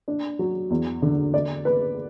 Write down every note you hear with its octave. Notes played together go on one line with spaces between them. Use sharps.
D4
F#3
E2
D3
D5
B4